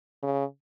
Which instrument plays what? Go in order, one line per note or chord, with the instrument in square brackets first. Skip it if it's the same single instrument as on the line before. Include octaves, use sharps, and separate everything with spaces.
[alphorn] C#3